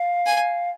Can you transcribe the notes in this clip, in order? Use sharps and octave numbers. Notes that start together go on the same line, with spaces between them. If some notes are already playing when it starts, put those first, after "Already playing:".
Already playing: F5
G#5